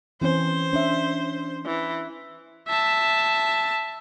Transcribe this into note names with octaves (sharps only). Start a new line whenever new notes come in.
E3 C4 C#4 C5
C#4 D4 E5
E3
E5 A5